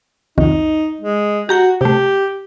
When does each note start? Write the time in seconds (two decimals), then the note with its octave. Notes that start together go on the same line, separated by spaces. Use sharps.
0.38 C2 F2 D#3 D#4
1.01 G#3
1.49 F#4 G4 A#5 G6
1.81 C3 A3 G4